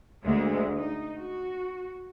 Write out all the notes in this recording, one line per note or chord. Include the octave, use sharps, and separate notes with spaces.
D2 G#3 A#3
D#4
F#4